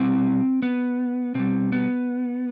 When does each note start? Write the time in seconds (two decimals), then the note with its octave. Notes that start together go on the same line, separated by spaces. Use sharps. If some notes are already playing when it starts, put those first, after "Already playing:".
Already playing: B2 G3 C4
0.62 B3
1.35 B2 G3 C4
1.72 B3